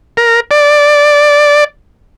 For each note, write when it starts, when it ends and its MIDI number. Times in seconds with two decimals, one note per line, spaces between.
0.17 0.40 70
0.51 1.64 74